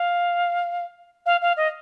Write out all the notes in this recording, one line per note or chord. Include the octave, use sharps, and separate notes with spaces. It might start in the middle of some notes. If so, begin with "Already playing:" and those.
Already playing: F5
F5
F5
D#5